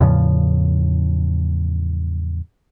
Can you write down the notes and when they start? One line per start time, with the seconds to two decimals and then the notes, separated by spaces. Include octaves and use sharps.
0.01 E2 A2 C#3 F3